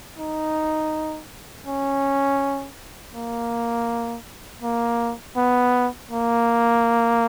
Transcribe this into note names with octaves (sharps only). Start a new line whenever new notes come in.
D#4
C#4
A#3
A#3
B3
A#3